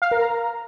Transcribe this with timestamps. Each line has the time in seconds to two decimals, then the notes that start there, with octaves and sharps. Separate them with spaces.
0.02 F5
0.11 A#4
0.21 A#5